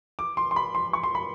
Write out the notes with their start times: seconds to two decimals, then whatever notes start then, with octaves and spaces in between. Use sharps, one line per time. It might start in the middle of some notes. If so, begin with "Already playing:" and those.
0.19 D6
0.37 C6
0.51 C6
0.56 B5
0.75 C6
0.93 C#6
1.03 C6
1.15 B5